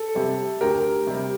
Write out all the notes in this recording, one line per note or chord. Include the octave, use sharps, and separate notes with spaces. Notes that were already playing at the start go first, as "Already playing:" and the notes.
Already playing: A4
C3 G3
D2 G4 A#4
C3 G3